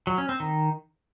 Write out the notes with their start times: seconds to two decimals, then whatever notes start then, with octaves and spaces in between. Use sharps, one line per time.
0.07 F#3
0.18 C#4
0.29 C4
0.40 D#3